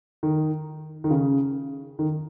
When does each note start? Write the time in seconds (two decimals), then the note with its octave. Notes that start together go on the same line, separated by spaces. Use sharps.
0.23 D#3
1.04 D#3
1.10 C#3
1.99 D#3